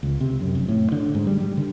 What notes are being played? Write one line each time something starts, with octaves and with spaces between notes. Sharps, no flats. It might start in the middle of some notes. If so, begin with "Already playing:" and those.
C#2
C3
F#2
F1
A2
D3
G#2
G3
G3
D3